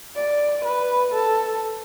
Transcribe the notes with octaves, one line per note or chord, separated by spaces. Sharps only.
D5
B4
A4